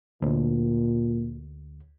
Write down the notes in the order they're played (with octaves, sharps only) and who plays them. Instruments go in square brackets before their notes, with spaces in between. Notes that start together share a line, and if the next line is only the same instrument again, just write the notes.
[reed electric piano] D2 [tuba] A#2